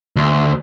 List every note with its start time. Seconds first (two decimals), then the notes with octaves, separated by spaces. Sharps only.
0.16 D2